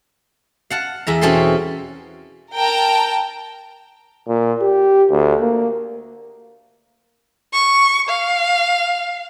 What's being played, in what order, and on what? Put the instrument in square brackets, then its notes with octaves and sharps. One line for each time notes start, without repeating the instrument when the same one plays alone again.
[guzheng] F5 F#5 A5
E2 E5 A#5
B2 C4 C#4 A4 A5 C6
[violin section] A#4 G5 A5 A#5
[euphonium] A#2
G4
D2
A#3
[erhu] C#6
F5